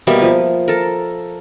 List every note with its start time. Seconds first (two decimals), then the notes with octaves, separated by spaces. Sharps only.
0.07 B2 G3 A#3 E5
0.22 F3
0.68 A4 A#4